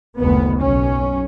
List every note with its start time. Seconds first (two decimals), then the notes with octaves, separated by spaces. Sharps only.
0.19 F#1 D2 D#3 B3
0.59 B1 C#4